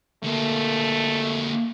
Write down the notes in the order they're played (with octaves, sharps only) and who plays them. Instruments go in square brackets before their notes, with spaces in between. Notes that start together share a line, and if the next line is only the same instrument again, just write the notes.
[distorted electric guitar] D3 A#3 [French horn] A3